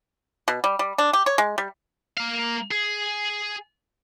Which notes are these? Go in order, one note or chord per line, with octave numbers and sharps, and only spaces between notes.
B2
G3
G3
D4
G4
C#5
G#3
G3
A#3 F5
G#4